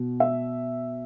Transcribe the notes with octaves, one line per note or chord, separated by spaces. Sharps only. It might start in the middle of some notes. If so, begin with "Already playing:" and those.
Already playing: B2
E5